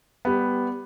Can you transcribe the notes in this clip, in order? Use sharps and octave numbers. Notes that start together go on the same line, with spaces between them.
G3 B3